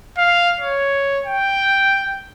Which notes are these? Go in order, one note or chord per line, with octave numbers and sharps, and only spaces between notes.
F5
C#5
G5